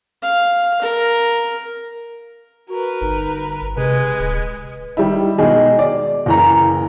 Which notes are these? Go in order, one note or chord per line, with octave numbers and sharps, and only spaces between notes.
F5
A#4
F#4 A#4 B4
G1 D#4
C3 G#3 B4
D1
D#3 G3 E4
B2 D#3 G#3 D#4 G#4
D5
F#1 E3 A#5